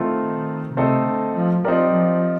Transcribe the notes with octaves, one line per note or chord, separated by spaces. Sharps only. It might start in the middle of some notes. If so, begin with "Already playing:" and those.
Already playing: D#3 A3 C4 F4
C3 A3 C4 D#4 A4 D#5
D3
F3
F3 C4 D#4 G4 A#4 D5
F3